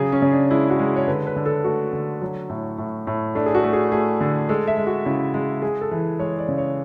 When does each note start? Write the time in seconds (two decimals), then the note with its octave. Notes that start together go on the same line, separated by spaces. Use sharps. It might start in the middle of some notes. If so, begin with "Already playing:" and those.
Already playing: C#3 F#3 G#4
0.12 C#4
0.22 C#3
0.32 D4
0.51 G#3 E4
0.70 F#4
0.80 G#3
0.96 C#5
1.08 D3 B4
1.27 B4
1.36 D3
1.46 A4
1.64 A3 F#4
1.93 D3
2.22 F#3
2.50 A2
2.78 A2
3.07 A2
3.35 A3 D4
3.46 G#4
3.55 F#4
3.64 A3
3.73 G#4
3.92 A3 G#4
4.21 D3
4.49 G#3 A4
4.67 E5
4.77 G#3
4.87 F#4
5.05 C#3 E4
5.34 G#3
5.62 G#3 G#4
5.81 A4
5.91 E3
6.20 G#3 C#5
6.39 D5
6.48 C#3
6.58 C#5